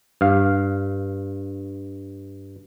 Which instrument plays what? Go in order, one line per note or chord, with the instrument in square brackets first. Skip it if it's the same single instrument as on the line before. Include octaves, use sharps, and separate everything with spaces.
[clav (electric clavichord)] G2 F5